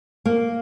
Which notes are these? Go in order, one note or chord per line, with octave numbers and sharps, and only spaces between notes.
A#3